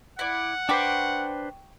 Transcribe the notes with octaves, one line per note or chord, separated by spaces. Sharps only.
E4 D5 F#5
D4 B4 C5 G5 C#6 D6